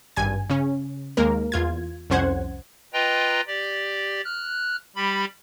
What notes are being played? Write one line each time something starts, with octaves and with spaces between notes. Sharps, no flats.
G#1 G2 G#5 G#6
C#3 C#4
D#2 G#3 A#3 A#4
E2 F4 G#6
C2 F2 C#4 C5 F#5 G#6
F4 B4 D#5 G5 A#5
G4 D5
F6 F#6
G3 G4 B5